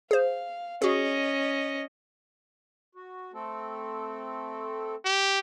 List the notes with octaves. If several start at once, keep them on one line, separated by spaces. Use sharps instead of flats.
G#4 C5 F5
C#4 F#4 G#4 D#5
F#4
A3 C4 A4
G4